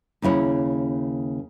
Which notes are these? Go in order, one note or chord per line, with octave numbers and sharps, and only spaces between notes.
D#2 C#3 E4 C#5